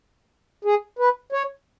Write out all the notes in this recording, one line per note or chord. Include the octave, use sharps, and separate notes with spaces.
G#4
B4
C#5